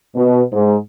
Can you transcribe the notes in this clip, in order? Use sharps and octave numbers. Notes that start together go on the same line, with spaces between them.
B2
G#2